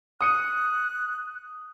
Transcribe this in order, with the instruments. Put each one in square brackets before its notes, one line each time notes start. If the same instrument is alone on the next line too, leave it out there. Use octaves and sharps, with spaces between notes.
[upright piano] D#6 C#7 D#7 [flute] F#6